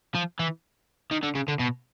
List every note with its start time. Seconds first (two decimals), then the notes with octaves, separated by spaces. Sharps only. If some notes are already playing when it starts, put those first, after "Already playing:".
0.15 F3
0.39 E3
1.11 D#3
1.23 D3
1.35 C#3
1.48 D3
1.59 B2